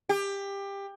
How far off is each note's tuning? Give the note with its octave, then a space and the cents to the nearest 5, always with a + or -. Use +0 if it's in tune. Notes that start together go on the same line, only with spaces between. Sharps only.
G4 +20